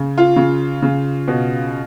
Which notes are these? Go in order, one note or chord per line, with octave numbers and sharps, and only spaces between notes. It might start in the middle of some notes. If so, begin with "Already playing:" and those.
Already playing: C#3
F4
C#3
C#3
B2